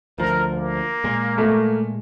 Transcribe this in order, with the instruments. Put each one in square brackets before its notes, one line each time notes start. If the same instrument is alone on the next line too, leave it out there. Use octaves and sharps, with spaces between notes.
[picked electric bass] D2 F3 [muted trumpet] A#4
[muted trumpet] A#3
[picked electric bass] A#2 G#3
[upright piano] A3